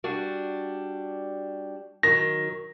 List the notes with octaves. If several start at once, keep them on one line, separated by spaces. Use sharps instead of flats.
G3 D4 F#4
D#3 F#3 A#6